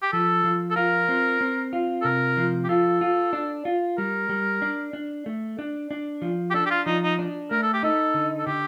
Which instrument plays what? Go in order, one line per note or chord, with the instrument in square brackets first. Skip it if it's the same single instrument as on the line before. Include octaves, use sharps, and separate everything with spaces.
[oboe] G4
[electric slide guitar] F3 [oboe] A4
[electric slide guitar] F3
[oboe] A4
[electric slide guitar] F4 [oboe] A#4
[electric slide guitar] C4
C4
F4
[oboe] A4
[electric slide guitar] C3 [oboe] A#4
[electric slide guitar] F3
[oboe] G4
[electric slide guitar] F4 [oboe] A4
[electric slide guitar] F4
D4
F4
[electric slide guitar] G3 [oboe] A#4
[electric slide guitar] G3
D4
D4
A3
D4
D4
F3
[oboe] G4
[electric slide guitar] D4 [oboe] A4
[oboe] G4
F4
[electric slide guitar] F3 [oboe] D#4
[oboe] D#4
[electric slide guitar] D4
[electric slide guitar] A3 [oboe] A#4
[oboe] A4
G4
[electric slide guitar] D#4 [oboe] A4
[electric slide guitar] D3
[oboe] A4
[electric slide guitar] D3 [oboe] G4